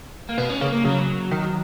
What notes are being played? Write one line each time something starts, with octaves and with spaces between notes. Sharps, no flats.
A#3
B2 B3
C#4
C#3 A#3
A#3
C#3 F#3
D#3